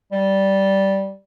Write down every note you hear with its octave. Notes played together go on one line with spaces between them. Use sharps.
G3